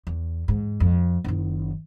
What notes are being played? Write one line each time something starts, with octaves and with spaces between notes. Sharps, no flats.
E2
G#2
F2
F#1 D#3